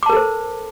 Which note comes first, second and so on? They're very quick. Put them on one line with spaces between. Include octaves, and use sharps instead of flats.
D6 A5 A#4 A4 C5